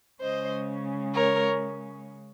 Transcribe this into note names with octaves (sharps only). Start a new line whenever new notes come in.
C#3 G#3 C#4 C5 D#5
A#4 C#5